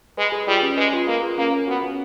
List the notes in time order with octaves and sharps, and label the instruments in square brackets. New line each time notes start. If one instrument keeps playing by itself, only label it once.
[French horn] G#3 [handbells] B4
[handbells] G#4
[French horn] G3 [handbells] F4
[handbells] C#4
[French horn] G#3 [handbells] B4
[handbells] F4
[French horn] A#3 [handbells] G#4
[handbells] F4
[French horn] A#3 [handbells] C#4
[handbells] A#4
[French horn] B3 [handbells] F#4
[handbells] C#4